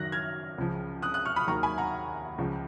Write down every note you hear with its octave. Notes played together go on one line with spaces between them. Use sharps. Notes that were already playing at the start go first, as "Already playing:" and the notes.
Already playing: F#2 D#3 F#3 F#6 A#6
F6 G#6
C#2 C#3 F3
D#6 F#6
D#6 F#6
C#6 F6
B5 D#6
D#2 D#3 F#3 A#5 C#6
G#5 B5
F#5 A#5
C#2 C#3 F3